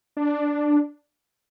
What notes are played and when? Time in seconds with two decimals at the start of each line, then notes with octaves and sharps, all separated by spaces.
0.17 D4